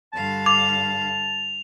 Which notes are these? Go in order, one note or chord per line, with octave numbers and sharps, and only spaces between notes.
G2 D3 F5 A5
D6 F7